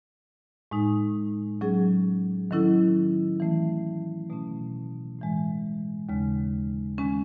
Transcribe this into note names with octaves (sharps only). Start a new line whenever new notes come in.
A2 G#3 D#4
F#3 C#4 G#4
D#3 F#3 C#4 E4 A4
E3 A3 C#4
B2 A3 C#4
A2 E3 G#3
D#2 C#3 G#3 C#4
D#3 G#3 C#4